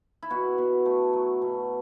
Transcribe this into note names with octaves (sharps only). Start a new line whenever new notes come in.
E4
B2 F#4
B2
A3
F#3
B2